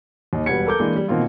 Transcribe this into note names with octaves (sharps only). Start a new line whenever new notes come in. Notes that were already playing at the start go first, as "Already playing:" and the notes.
D#2 D#4
E1 G3 B4 F#5 G#6 C#7
A4 A#4 D6 G6
E3 G#3 A#3 D4 G#4 A#4
G3
B2 D#3 A#3 C4 F4